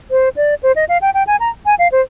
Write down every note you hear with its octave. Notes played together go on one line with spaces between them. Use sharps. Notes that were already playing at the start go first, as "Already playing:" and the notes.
C5
D5
C5
D#5
F5
G5
G5
G#5
A#5
G#5
F5
C5